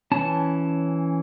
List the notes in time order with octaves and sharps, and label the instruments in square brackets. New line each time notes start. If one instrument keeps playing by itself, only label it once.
[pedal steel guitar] E3 C#4 A5